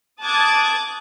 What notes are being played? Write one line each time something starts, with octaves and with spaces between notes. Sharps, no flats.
A5 D6 D#6 F#6 G#6 A6